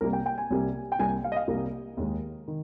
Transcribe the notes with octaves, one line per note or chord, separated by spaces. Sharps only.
C2 C3 G3 A#3 A#4
G5
G5
G#5
C2 C3 G3 A#3
G5
C2 C3 G3 A#3 G#5
F5
D#5
F5
C2 C3 G3 A#3 A#4
D#2 D#3 G#3
D#3